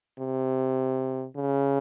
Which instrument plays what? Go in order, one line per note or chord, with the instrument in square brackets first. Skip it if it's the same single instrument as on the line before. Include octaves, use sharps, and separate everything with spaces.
[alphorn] C3
C#3